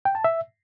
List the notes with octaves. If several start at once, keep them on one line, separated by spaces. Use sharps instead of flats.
G5
A5
E5